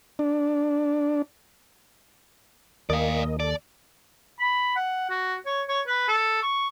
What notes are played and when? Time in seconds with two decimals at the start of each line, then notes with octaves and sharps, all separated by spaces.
0.19 D4
2.90 D#2 A#3 D5 D#5 F5
3.40 A4 D5
4.39 B5
4.76 F#5
5.10 F#4
5.46 C#5
5.68 C#5
5.87 B4
6.08 A4
6.43 C#6